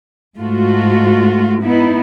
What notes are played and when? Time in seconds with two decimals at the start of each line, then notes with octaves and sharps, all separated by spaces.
0.37 G#2 A3 F4 F#4
1.62 B3 D#4 E4